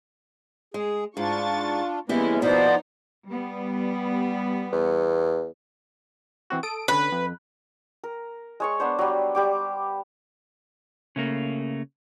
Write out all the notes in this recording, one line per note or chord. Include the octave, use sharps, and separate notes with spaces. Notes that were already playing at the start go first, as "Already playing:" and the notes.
G#3 G#4
G#2 D4 F4 C#6 A6
E3 G3 G#3 A#3 B3 C#4 E4
B2 F3 B3 D#4 C5 D5
G3 B3
E2
E3 C4 F#4
A4 D#6 D7
D3 C#4 B4
F2
A#4
G#3 C#5 C#6
B3 D4 C5
F#3 G3
G3 G4 D6
C#3 A3 A#3